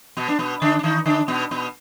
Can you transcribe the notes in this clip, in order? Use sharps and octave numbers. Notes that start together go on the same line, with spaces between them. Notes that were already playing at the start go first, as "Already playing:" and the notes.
B2 B3
D4
B2 B3
D3 D4
D4
D#3 D#4
D3 D4
B2 B3
B2 B3